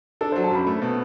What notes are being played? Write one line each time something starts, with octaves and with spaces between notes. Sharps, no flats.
D4 A4
F#3 C5
A5
F#2 B5
A3
B2